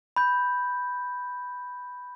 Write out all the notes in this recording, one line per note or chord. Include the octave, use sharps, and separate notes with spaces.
B5 G6